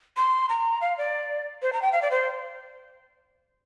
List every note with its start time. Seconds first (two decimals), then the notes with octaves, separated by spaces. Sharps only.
0.17 C6
0.49 A#5
0.81 F5
0.98 D5
1.62 C5
1.73 A#5
1.82 G5
1.92 F5
2.02 D5
2.11 C5